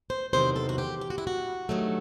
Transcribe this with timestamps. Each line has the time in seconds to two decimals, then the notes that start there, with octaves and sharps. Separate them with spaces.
0.10 C5
0.33 E2 C3 D#3 F#3 C5
0.56 A4
0.69 F#4
0.78 G4
1.01 G4
1.10 F#4
1.18 E4
1.27 F#4
1.69 G2 D#3 F#3 A3